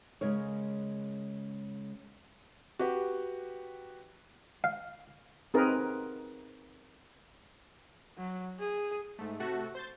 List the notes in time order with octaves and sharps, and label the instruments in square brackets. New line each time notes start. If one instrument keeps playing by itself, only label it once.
[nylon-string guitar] C#3 G#3 A#4 C#5
[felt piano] F#4 G4 B4
[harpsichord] F5
[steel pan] C4 D#4 G#4 A#4 B4
[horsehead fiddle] F#3
G#4
[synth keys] G#2 A3
C3 A3 F#4 A4
C5 G6 A6